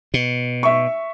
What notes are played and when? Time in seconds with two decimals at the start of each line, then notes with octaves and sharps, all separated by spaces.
0.14 B2
0.63 E5 C#6